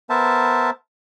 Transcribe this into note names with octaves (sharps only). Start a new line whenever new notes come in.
B3 A#4 C5 E5 A5